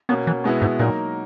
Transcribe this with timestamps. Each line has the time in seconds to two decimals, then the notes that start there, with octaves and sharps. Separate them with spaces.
0.09 B2 A#3 B3 C#4
0.27 E3
0.44 B2 G#3 B3 E4
0.62 G#2
0.79 A#2 F#3 A#3 D#4 A#4